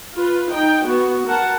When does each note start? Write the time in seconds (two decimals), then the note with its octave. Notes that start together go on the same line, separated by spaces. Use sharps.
0.15 F4 B4
0.51 D#4 G5
0.85 B3 F#4
1.27 A#4 F#5 A5